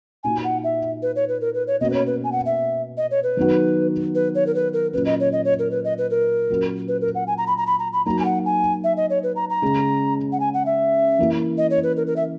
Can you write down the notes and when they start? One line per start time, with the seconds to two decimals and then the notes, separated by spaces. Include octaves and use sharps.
0.24 A#2 A#3 D#4 F#4 G#5
0.44 F#5
0.64 E5
1.02 B4
1.16 C#5
1.29 B4
1.41 A#4
1.55 B4
1.67 C#5
1.81 B2 A#3 C#4 F#4 D#5
1.90 B4
1.94 C#5
2.07 B4
2.24 G#5
2.32 F#5
2.46 E5
2.97 D#5
3.11 C#5
3.23 B4
3.37 D#3 F#3 B3 D#4 F#4
4.15 B4
4.35 C#5
4.47 A#4
4.55 B4
4.74 A#4
4.93 A#2 F#3 C#4 B4
5.06 D#5
5.20 C#5
5.32 D#5
5.45 C#5
5.59 A#4
5.71 B4
5.85 D#5
5.98 B4
6.10 A#4
6.49 A#2 F#3 C#4 F#4
6.88 B4
7.01 A#4
7.15 F#5
7.27 G#5
7.38 A#5
7.47 B5
7.58 A#5
7.67 B5
7.79 A#5
7.93 B5
8.06 F#3 A#3 D#4 F#4 A#5
8.20 G#5
8.25 F#5
8.46 G#5
8.84 E5
8.97 D#5
9.10 C#5
9.23 B4
9.36 A#5
9.50 A#5
9.62 C#3 G#3 C#4
10.32 F#5
10.40 G#5
10.54 F#5
10.66 E5
11.19 E3 A#3 E4
11.58 D#5
11.70 C#5
11.83 B4
11.97 A#4
12.07 A#4
12.16 E5